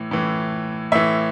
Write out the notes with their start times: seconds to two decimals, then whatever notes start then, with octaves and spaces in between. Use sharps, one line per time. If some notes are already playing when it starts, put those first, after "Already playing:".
Already playing: A2 E3
0.11 A2 E3
0.92 A2 E3 E5